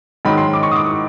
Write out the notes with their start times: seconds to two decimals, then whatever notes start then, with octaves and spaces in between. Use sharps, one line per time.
0.25 G#2 D#3 F#3 B5
0.38 C6
0.53 D6
0.63 C#6
0.71 D#6
0.76 D6